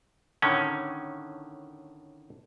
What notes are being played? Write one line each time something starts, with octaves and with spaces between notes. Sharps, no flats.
A2 D3 D#3 C#4